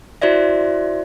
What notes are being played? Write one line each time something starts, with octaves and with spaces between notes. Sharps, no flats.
E4 F#4 C5 D5 E5